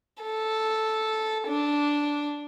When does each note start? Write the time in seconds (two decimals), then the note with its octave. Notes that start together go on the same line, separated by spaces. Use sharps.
0.24 A4
1.48 D4